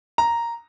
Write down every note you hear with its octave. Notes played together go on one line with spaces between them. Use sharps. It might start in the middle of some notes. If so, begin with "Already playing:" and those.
A#5